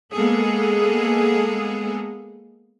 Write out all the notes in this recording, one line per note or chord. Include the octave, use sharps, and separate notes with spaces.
G#3 A#3 B3 G#4 A4